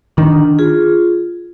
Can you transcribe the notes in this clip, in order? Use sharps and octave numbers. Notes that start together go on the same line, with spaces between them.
D#3 D4
F4 G#4